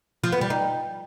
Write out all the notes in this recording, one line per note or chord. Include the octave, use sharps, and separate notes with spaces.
F3
B3
G3
D#4